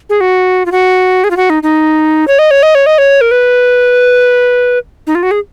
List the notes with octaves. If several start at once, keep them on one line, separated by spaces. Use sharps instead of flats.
G#4
F#4
F4
F#4
G#4
F4
F#4
D#4
D#4
C#5
D#5
C#5
D#5
C#5
D#5
C#5
A#4
B4
D#4
F4
F#4
G#4